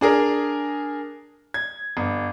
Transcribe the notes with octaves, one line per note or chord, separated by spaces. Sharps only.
D4 G#4 A#4
G#6
G1